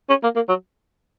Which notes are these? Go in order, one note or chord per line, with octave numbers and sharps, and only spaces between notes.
C#4
A#3
A#3
F#3